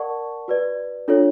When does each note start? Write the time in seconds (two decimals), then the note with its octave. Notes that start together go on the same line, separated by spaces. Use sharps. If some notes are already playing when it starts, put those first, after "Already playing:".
Already playing: A#4 D5 F#5 A5 C#6
0.48 F#4 B4 D5
1.08 D4 F4 A4 C#5